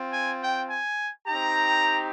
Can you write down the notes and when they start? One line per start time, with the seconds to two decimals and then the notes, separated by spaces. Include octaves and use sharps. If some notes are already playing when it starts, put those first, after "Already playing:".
Already playing: C4 F4
0.12 G#5
0.41 G5
0.70 G#5
1.27 C4 D#4 G4 A#5